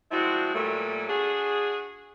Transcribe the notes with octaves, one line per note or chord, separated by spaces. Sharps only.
F3 G3 G#3 E4 F#4
A#2 F#3 G3 A3 A#3
D4 F#4 G#4